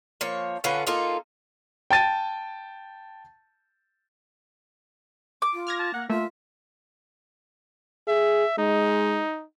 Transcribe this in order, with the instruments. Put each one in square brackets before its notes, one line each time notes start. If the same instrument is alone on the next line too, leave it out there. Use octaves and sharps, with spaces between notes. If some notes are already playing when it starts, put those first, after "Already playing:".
[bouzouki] F3 A#3 C#5
D3 C#4 F4 B4
A#3 D#4 F4 A4
[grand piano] G5 A5 A6 D#7
[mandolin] D6
[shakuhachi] F4
[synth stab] F6 G#6 A#6
[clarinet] A5
[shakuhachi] A#3 [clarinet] F#5
[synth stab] A3 A#3 [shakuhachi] F4 [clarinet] E5
[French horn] G#4 [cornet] E5
[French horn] G#3 [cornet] D#4